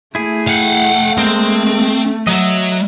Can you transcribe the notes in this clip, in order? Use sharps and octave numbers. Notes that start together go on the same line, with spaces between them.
A3 E4 G#4
F5 F#5
G#3 A#3 C4
F#3 D#5 E5